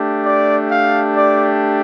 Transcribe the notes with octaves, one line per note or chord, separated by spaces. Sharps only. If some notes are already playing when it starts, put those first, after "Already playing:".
Already playing: A3 D4 G4
D5
F5
D5